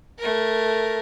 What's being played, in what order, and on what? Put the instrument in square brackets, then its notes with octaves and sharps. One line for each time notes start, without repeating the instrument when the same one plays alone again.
[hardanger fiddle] A3 A#4